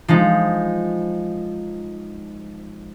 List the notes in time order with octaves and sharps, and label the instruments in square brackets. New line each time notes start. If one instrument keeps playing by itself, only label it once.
[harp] F3 G#3 D#4